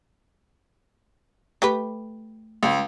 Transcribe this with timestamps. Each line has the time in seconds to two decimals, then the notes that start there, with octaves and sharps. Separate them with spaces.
1.62 A3 G4 B4
2.63 C#2